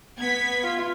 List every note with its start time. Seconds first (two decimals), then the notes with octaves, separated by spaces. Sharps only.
0.19 B3 G#6 B6
0.64 F4